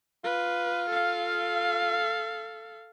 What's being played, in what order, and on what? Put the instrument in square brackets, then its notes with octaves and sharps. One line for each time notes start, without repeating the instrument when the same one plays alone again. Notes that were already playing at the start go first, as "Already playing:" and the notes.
[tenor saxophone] F4 [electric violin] B4
[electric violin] A4 F5